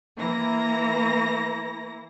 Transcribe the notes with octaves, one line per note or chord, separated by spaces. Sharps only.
E3 A#3 E4 A#5 A#6